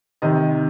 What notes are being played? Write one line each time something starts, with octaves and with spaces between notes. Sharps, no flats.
C3 D#3 D#5